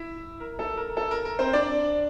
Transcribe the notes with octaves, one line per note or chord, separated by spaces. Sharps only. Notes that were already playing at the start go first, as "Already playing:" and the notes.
Already playing: E4 E5
A#4
A4
A#4
A4
A#4
A#4
C4 C5
D4 D5